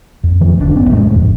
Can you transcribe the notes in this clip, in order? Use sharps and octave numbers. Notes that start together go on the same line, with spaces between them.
F2
D#3 F3 A3
F1 D2 A#2 D4
G#1 B3 C#4
F2 A2 G#3 A3
D#1 G#1 F2